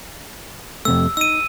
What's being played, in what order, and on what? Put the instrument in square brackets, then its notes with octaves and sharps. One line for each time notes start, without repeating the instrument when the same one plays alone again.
[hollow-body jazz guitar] F2 C3 A3 [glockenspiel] E6
[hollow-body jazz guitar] D#4 [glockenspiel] E6 D#7